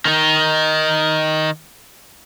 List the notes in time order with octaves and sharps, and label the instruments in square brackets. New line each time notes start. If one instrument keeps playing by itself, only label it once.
[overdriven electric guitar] D#3 D#4